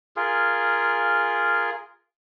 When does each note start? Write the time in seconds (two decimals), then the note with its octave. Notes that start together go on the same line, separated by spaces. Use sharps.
0.16 F4 G#4 A#4